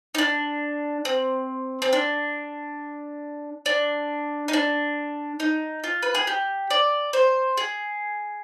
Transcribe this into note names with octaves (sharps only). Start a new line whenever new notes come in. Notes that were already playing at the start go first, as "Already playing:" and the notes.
D#4
D4
C4
C4
D4
D4
D#4
D4
D#4
F4
B4
G#4
G4
D5
C5
G#4